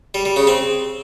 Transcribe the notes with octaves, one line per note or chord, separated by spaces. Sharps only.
G3
G3
C#3
C4